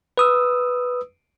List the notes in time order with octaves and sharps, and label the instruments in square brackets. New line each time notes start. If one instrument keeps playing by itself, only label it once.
[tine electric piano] B4 D#6 E6